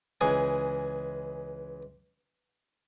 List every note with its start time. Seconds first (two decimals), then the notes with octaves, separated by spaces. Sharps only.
0.21 C#2 E3 G#4 G#5